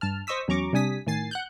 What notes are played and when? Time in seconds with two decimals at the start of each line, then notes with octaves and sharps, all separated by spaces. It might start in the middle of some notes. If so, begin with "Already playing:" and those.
0.01 G2 A5 F6
0.27 C5 D#5 C#6 D#6 E6 B6
0.48 E2 F#3 C#4 A#5 C#6 D6
0.73 C3 G3 D4 G#5 D#6 B6
1.07 A2 D#3 G#5 A6 C7
1.31 F#5 F#6 G6